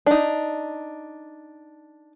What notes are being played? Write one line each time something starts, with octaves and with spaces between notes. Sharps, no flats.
D4 D#4